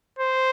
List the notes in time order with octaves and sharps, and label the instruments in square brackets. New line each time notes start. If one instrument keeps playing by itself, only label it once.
[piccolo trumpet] C5